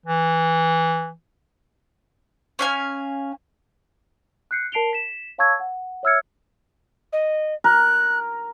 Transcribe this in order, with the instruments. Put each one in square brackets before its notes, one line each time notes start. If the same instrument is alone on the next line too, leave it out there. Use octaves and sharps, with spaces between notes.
[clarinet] E3
[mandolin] C#4 F5 G#5
[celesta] F#6 G6 C7 C#7
A#4 A5 C7 D7 F7 G7
B6 E7
C#5 F5 A5 C#6 E6 G#6
F#5
C#5 E5 E6 F6 G#6 C#7
[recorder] D#5
[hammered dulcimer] A#4 [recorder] F#6